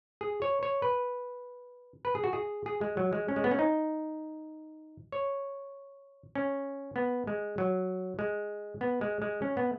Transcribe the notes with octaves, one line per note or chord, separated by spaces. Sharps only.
G#4
C#5
C#5
B4
B4
G#4
F#4
G#4
G#4
G#3
F#3
G#3
C#4
G#3
B3
C#4
D#4
C#5
C#4
B3
G#3
F#3
G#3
B3
G#3
G#3
C#4
B3